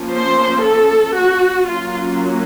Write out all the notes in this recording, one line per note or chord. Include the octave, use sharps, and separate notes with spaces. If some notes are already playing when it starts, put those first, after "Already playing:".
Already playing: F3 A#3 C#4
C5
A4
F#4
F#3 A#3 C#4 F4